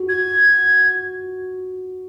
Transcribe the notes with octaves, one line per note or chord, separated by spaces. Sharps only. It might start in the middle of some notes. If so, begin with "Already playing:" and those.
Already playing: F#4
G#6